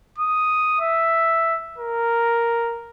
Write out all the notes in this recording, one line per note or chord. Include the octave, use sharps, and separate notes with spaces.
D#6
E5
A#4